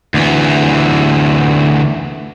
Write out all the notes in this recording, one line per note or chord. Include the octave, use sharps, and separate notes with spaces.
D2 E3